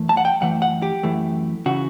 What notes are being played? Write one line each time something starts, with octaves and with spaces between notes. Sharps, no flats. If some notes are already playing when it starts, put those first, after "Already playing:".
Already playing: F#2 E3 A3
A5
F#5
G5
F#2 E3 A3 F#5
F#5
G4
F#2 E3 A3
C#3 E3 F#4